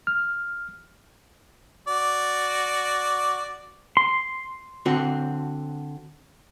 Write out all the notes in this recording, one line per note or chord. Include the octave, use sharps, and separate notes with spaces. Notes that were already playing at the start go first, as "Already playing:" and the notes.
F6
F#4 D5
C6
D3 C4 F#4